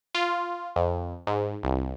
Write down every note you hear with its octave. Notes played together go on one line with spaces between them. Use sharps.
F4
F2
G#2
C2